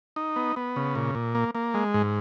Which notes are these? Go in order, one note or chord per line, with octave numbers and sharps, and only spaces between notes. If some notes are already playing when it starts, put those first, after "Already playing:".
D#4
B3
B3
C#3
A#2
A#2
A#3
A#3
G#3
G#2